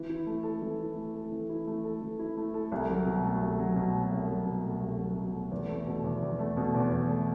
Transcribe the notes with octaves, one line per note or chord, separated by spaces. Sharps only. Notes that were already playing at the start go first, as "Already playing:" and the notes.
Already playing: E3
E4
A3
A4
E3
E4
A3
A4
E3
E4
A3
A4
E3
E4
A3
A4
C2
F#3
B2
A3
C2
F#3
B2
A3
C2
F#3
B2
A3
C2
F#3
B2
A3
E2
A3
B2
E2
E2
A3
B2
E2
E2
A3